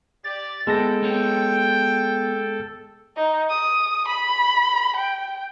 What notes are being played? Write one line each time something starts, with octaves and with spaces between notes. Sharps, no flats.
G4 D5 A6
G#3 B3 E4 A4 G5 A5 A#6
B3 C#5 G5
D#4
D#6
B5
G5